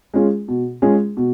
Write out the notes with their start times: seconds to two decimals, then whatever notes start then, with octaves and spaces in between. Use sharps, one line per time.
0.14 G#3 C#4 F4 G#4
0.48 B2
0.82 G#3 C#4 F4 G#4
1.17 B2